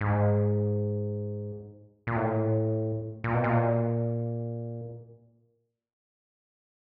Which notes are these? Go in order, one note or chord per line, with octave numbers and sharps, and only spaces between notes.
G#2
A#2
A2
A#2
B2
A#2